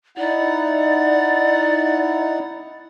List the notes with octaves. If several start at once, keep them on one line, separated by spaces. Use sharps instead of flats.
D#4 E4 D5 F#5